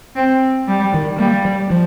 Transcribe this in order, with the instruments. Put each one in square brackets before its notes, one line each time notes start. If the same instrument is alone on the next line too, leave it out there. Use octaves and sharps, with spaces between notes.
[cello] C4
G3
[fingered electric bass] D#3
[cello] G3 [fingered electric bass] A#3
[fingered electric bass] G3
F3